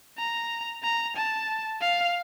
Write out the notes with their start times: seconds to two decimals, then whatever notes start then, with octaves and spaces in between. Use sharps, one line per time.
0.18 A#5
0.83 A#5
1.17 A5
1.81 F5